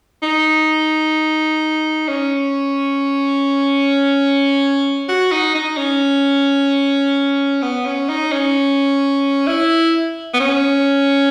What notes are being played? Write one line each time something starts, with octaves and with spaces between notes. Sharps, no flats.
D#4
C#4
F#4
D#4
D#4
C#4
B3
C#4
D#4
C#4
E4
B3
C#4